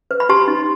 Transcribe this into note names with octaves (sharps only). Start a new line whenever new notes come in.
B4
B5
G4 A5 C6
D#4